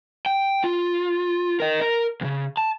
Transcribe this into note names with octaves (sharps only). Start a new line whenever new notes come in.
G5
F4
A#4 D#5
A#4
D2 C#3
A5